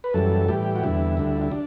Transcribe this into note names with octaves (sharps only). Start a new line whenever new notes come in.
B4
F#2 E3 G3 A4
A2 E3 G3 G4
F#4
E2 D3 G3 E4
D2 D3 G3
E4
D4